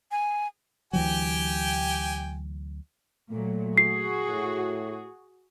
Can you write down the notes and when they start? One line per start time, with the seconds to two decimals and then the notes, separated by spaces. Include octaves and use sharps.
0.11 G#5
0.93 D2 E3 F#3 G4 G5 G#5
3.31 A#2 F#3 A3
3.78 F#4 G#4 C7
4.29 A2